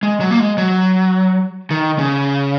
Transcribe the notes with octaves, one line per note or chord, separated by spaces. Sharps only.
G#3
F#3
A#3
G#3
F#3
D#3
C#3